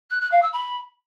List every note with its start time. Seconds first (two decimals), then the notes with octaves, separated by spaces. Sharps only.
0.10 F#6
0.21 F#6
0.31 F5
0.42 E6
0.52 B5